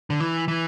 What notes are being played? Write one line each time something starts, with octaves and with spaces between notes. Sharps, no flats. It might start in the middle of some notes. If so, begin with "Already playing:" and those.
D3
E3
E3